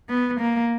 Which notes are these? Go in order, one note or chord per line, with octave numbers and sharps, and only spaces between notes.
B3
A#3